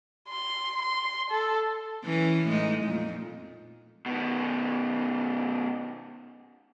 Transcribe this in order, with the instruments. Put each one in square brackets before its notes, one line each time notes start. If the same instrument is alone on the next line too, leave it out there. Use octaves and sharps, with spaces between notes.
[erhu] C6
C6
A4
[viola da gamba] E3 C#4
A2 G#3 D#4
F2 A#2
[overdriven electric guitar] B2 D#3